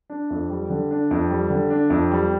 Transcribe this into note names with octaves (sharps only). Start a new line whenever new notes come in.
D4
F2
G3
D3
D4
F2
G3
D3
D4
F2
G3